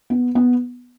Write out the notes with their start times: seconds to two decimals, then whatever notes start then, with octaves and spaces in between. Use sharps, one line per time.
0.10 B3
0.35 B3